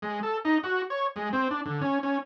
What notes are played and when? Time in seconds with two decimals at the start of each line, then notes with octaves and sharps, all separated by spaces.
0.02 G#3
0.23 A4
0.45 D#4
0.63 F#4
0.90 C#5
1.16 G#3
1.33 C4
1.51 D4
1.66 D3
1.81 C#4
2.03 C#4